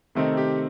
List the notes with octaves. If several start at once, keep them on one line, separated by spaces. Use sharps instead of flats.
C3 D#3 A3 C4 D#4
G4